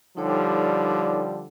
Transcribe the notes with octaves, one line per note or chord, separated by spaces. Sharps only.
D3 F3 G3 D#4 A4 C#5